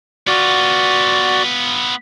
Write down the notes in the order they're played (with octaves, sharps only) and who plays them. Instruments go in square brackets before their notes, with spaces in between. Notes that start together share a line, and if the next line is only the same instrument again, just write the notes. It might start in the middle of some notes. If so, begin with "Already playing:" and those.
[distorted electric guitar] B3 F4 [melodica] F#4 D5